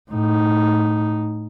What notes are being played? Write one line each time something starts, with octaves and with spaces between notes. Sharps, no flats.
A2 D#4